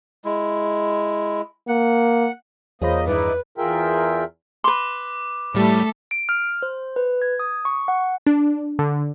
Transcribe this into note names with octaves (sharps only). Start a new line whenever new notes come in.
G#3 E4
A#3 F#5
E2 A#3 F4 G#4 C5 C#5 D#5 B5
G2 D#3 D#4 E4 G#4 B4 D5
E2 F4 G#4 A#4 E5 G5
B4 C6 D6
A2 G3 A3 A4
D7
F6
C5
B4
G#6
D#6
C#6
F#5
D4
D3